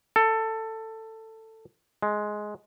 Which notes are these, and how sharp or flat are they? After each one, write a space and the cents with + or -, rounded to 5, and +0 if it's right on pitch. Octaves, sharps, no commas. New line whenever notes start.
A4 +15
G#3 +10